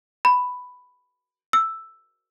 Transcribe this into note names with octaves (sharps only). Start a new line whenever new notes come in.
B5
E6